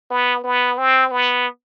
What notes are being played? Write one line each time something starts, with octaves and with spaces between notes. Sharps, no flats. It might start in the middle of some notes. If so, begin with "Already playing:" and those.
B3
B3
C4
B3